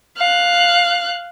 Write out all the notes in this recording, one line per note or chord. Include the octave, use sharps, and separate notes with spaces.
F5 F#6